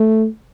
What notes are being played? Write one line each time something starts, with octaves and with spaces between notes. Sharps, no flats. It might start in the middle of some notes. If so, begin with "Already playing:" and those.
Already playing: A3